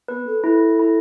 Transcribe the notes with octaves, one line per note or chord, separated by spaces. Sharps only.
B3 B4
A4
E4 A4
E4